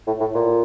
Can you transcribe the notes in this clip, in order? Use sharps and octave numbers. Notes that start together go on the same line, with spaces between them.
A2
A2
A#2